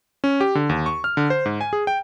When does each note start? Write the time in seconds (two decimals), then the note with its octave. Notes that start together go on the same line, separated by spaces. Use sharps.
0.24 C#4
0.41 G4
0.55 D3
0.69 D#2
0.86 C#6
1.04 F6
1.17 D3
1.30 C5
1.46 G#2
1.61 G#5
1.73 G#4
1.87 G5